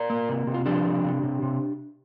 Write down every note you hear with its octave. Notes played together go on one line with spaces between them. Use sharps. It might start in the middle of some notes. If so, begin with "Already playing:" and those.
Already playing: A#4 D5
A#3
C3
C3
F4
F3 D4 G4
C3
C3
C3
C3